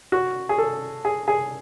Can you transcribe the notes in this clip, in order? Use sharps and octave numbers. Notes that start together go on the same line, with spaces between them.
F#4
G#4
A4
G#4
G#4